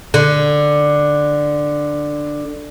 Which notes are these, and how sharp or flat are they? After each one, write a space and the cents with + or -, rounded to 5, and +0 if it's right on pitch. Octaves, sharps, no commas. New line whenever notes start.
D3 +10